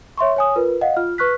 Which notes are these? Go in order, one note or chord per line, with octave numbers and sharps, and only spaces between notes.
C#5 E5 C6 C#6
C#5 G#5 D#6
F4 A#4 B4
D#5 F5 F#5
F4 F6
B4 C#6 F6 F#6 B6